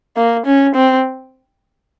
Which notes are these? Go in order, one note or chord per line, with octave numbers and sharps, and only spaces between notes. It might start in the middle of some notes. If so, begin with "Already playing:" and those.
A#3
C#4
C4